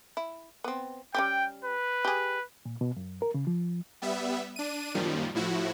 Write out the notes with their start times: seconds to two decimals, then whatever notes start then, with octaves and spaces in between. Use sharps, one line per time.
0.17 E4
0.64 B3 C4
1.14 G3 C#4 G4 G5
1.65 B4
2.05 G4 G#4
2.66 A#2
2.81 B2
2.97 F#2
3.22 A#4
3.34 C#3
3.47 F3
4.02 G3 B3 E5
4.56 D4 D#7
4.94 F#2 A#2 D#3 F3 G3
5.35 A2 F3 E4 F#4